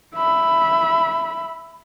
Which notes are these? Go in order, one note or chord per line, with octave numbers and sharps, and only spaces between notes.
E5 B5